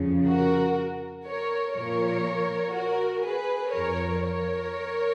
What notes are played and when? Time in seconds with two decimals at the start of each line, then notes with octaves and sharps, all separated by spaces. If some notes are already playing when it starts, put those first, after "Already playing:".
Already playing: F2 C#3 F3
0.27 F#4 A#4
1.26 A#4 C#5
1.75 A#2 F3 A#4 C#5
2.74 F#4 A#4
3.23 G#4 B4
3.72 F2 F3 A#4 C#5
4.22 A#4 C#5